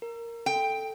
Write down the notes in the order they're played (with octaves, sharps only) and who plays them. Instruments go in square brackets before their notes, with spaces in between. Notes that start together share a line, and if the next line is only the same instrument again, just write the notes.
[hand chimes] A#4
[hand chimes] A4 [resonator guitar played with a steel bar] G5